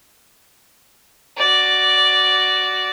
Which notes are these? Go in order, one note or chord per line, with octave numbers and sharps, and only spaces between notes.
F#4 D5